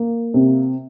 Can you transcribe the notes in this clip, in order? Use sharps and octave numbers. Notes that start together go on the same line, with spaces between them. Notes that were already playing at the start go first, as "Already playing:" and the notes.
Already playing: A#3
C3